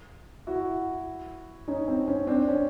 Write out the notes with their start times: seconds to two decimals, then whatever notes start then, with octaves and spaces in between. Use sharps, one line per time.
0.47 E4 F#4
1.68 C#4 D#4
1.88 C4
2.08 C#4
2.27 C4 D4
2.48 C#4